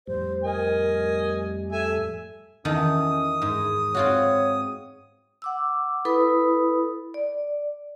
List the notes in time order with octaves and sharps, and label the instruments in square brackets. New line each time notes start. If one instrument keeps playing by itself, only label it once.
[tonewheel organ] F2 A2 G3 [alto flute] C5
[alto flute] A#4 [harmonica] D#5 G#5
[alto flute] A4 [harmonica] E5 G#5
[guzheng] E2 D#3 A4 [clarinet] C#4 [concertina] D#6
[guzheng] G#2 [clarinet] G#4
[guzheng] C4 F4 F#4 [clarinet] C#5
[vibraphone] F#5 D6 E6
E4 A4 B4 B5 D#6
D5